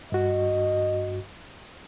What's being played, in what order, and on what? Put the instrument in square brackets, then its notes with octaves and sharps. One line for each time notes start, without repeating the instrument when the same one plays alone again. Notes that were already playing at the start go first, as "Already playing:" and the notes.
[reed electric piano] G2 F#4 [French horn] D#5